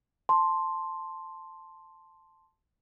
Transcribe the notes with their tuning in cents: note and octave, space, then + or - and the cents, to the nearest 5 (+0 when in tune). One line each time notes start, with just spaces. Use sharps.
A5 +0 C6 +0